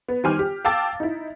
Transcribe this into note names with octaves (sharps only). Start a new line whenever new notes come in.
B3
D#3 G3 C5 G#5 D6 F6
G4
F5 G5 A5 D6 E6 A6
D#4 E4